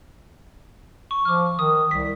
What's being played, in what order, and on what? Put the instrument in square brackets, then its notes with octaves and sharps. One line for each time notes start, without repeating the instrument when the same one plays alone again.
[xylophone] C#6
[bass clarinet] F3 [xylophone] D6 F6
[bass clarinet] D#3 [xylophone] D#6
[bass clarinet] C2 [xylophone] B6